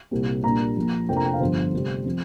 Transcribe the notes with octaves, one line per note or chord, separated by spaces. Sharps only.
C2 A#2 G3 C4
A#1 A#2 G3 D4 A#5
A#1 A#2 F3
F1 F2 F3 A#3 D4 G5
A#5
G5
F5
G1 G2 F3 C5
F1 F2 D3 G3
F3 C4